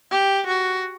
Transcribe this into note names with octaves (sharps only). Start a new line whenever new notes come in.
G4
F#4